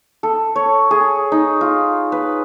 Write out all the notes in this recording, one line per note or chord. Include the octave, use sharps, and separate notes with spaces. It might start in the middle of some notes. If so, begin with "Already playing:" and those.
A4
C#5
G#4
D#4
F4
B4